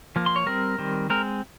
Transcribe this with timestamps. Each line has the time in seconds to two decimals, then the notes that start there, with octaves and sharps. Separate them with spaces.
0.16 F3 A#3
0.26 C6
0.36 C#5
0.46 G3 C4 A#4
0.78 D#3 G3 C4
1.10 G#3 C4 A#4